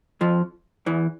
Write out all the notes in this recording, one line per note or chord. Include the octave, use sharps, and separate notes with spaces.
F2 F3
E2 E3